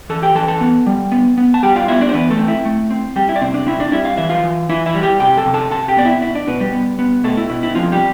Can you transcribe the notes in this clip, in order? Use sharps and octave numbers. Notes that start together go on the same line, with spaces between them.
E3 A4 A5
G4 G5
E3 A4 A5
A4 A5
B3
G3
B3
B3
A5
G3 G4 G5
F4 F5
B3 E4 E5
D4 D5
C5
E3 B3 B4
A3 A4
C4
E4 E5
A3
C4
G3 G4 G5
E4 E5
D5
C3 C4 C5
D4 D5
C4 E4 E5
D4 D5
G3 E4 E5
F5
E3 E5
F4 F5
E3
E3 E4 E5
E4 E5
G3
G4 G5
C3 G4 G5
A4 A5
C3
A4 A5
C3 A4 A5
G4 G5
B3 D5
E4 E5
B2 E4 E5
D4 D5
B2 B3 B4
G3 G4
B3
B3
B2 A3 A4
E4
B2 E4
E4
F3 C4 F4
G3 G4